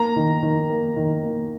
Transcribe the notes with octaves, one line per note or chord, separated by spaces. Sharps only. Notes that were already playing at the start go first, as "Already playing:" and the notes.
Already playing: A#3 A#5
D#3
D#3
A#3
D#3
A#3